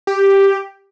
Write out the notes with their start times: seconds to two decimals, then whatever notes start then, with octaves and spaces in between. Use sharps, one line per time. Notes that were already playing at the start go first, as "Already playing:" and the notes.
0.07 G4